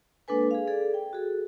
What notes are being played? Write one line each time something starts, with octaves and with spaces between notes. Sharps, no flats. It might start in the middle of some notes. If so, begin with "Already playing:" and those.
G#3 A#3 D4 A4 B4 G#5
G#4 F5
G#4 A4 D5
G5
F#4 G#4 A4